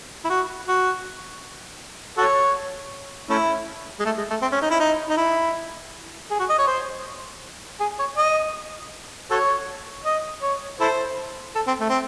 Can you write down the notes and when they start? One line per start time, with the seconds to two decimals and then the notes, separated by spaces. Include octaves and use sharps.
0.25 E4
0.29 F#4
0.68 F#4
2.17 F#4 A4 C#5
3.30 A3 C#4 E4
4.00 G#3
4.05 A3
4.18 G#3
4.30 A3
4.42 C4
4.52 C#4
4.62 D#4
4.70 E4
4.80 D#4
5.10 D#4
5.17 E4
6.31 G#4
6.39 F#4
6.49 D#5
6.59 C#5
6.67 C5
7.80 G#4
7.99 C#5
8.17 D#5
9.31 F#4 A4 C#5
10.05 D#5
10.42 C#5
10.80 E4 A4 C5
11.56 A4
11.68 C4
11.80 A3
11.89 C4